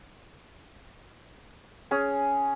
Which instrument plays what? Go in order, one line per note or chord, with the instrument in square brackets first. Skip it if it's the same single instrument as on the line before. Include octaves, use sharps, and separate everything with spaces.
[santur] C#4 G#4